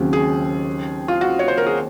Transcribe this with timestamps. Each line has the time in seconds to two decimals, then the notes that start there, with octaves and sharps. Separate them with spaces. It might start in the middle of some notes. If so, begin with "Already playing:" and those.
Already playing: D#2 C#3 F#3 C4
0.13 G#4
1.08 F4
1.21 F#4
1.39 C#5
1.48 C5
1.58 A#4
1.66 G#4